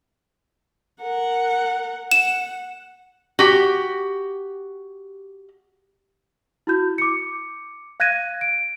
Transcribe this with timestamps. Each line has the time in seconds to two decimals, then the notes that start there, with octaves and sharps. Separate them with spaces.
1.02 A#4 F#5
2.12 F#5 E7
3.39 F#4 G4
6.67 E4 F#4 G6
6.98 D6 C#7
8.00 F5 F#6 G#6 A#6 D#7
8.41 D7